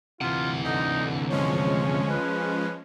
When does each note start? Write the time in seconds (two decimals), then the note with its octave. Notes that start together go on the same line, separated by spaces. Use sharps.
0.21 D2 C3 E3 F4 F#5
0.65 D3 D#4
1.30 F3 G#3 C#4 C#5
2.10 B4